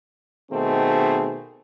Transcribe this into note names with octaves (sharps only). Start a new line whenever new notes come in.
B2 D#3 A3 C4 G#4